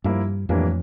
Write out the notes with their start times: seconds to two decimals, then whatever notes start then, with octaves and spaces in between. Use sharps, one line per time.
0.04 G2 F3 A#3 E4
0.49 F2 A2 E3 G3 A#3 D4